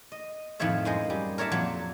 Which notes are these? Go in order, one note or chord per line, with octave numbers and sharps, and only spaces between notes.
D#5
F2 A2 D#3 F3 C#5 E5
F#2 G#3 C5 D#5
G3
A#4 C#5 D5 E5 A5
F2 A#2 F#3